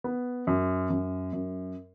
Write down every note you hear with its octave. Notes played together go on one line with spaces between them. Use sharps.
B3
F#2
F#2
F#2